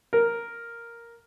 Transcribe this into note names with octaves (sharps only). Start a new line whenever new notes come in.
A#4